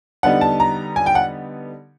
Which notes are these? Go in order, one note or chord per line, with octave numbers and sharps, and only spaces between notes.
D3 G3 B3 D#4 F#5
A5
A#5
G#5
G5
F#5